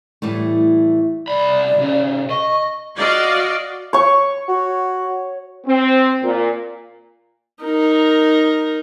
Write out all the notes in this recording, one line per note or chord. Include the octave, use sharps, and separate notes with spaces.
A2 E3 G3 A3
C2 D5 B5
C3 C#4
D#5 C#6
F#4 D5 D#5 F5
C#5 C#6
F#4
C4
A#2
D#4 A#4